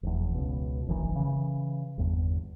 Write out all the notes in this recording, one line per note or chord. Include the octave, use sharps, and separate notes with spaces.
F1 E2
C#2 B2
F1 A#1 D#3 E3
C#3 E3
G1 E2